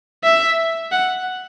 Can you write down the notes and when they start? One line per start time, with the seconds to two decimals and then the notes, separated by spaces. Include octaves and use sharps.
0.24 E5
0.92 F#5